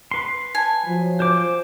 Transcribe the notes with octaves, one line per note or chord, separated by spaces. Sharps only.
B4 C6
G#5
F3 F#3
C5 D6